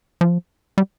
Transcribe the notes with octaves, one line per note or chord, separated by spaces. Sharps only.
F3
G3